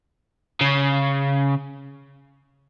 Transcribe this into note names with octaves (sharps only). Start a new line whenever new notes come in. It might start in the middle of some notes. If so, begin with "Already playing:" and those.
C#3